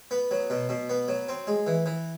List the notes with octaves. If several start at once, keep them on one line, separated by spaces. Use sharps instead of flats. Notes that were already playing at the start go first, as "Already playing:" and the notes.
B3
F#3
B2
B2
B3
F#3
C4
G#3
E3
E3